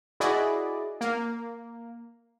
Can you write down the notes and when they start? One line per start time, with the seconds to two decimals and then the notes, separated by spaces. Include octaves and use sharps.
0.20 E4 F#4 G#4 D5 D#5
1.01 A#3